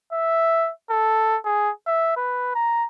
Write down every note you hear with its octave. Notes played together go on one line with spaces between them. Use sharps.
E5
A4
G#4
E5
B4
A#5